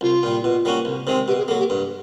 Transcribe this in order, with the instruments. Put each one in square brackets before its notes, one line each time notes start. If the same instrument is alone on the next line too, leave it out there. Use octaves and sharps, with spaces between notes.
[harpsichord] C2 [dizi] F4
[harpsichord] A#2 G3
B2
G3 A#3 C#4 F#4
C2
C3 D#3 G#3 C4
[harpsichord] B2 [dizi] G4
[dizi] G#4
[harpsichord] F#3 A#3 [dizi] A4
[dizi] G4
[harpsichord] G2